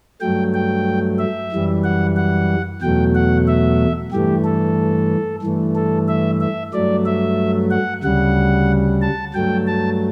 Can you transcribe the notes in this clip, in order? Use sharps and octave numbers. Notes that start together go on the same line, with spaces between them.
G2 F#3 A3 G5
G5
E5
F#2 E3 G3
F#5
F#5
E2 B2 F#3 A3 G5
F#5
E5
G2 E3 A3 G4
A4
G2 E3 A3
A4
E5
E5
G2 F#3 A3 D5
E5
F#5
D2 C#3 G3 F#5
A5
G2 F#3 A3 G5
A5